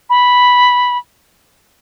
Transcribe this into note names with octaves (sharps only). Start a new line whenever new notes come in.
B5